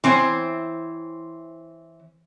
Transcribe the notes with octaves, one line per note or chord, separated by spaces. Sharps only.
E3 C4 C5 C#5